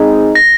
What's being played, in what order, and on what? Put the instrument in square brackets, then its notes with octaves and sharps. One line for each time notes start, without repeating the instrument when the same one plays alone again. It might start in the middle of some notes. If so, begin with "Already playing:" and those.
Already playing: [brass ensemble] G#3 C4 D#4 G#4
[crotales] A#6